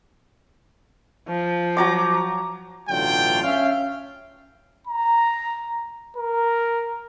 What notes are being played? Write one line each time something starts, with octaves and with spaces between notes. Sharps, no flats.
F3
F#3 A#5 D6
A1 B2 D3 F#3 F4 G5
C#4 E5 F5
A#5
A#4